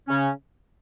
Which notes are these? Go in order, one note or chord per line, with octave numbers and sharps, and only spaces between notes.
C#3 C#4